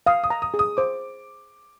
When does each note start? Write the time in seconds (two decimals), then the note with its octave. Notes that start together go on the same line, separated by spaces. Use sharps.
0.07 F5 D#6
0.24 D#6
0.30 A#5
0.42 D#6
0.54 G#4
0.59 D#6
0.77 C5 D6